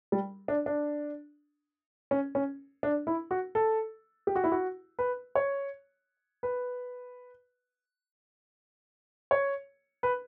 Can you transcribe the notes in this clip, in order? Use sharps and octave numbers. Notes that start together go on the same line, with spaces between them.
G3
D4
D4
C#4
C#4
D4
E4
F#4
A4
G4
F#4
E4
F#4
B4
C#5
B4
C#5
B4